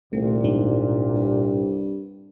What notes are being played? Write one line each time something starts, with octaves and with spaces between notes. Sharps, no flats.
D#1 C2 A#2 A3
G#2 D4 D#4
G2